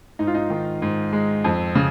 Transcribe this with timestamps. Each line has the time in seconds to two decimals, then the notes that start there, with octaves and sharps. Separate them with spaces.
0.19 G#2 D#4
0.27 F4
0.34 D#4
0.50 D#3
0.82 G#2
1.13 G#3
1.44 F2
1.75 C#3